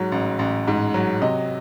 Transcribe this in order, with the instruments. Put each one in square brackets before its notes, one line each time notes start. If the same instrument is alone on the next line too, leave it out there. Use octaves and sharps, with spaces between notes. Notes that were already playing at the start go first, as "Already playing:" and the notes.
Already playing: [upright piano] G#2 F#3
A1
A1
G#2
F#3
C3 D#5